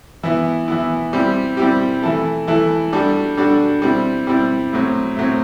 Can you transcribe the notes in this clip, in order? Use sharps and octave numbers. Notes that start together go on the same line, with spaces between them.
E3 B3 E4
E3 B3 E4
G3 C4 E4 G4
G3 C4 E4 G4
E3 A3 E4 A4
E3 A3 E4 A4
G3 D4 F#4 A4
G3 D4 F#4 A4
G3 C4 E4
G3 C4 E4
A2 F#3 C4
A2 F#3 C4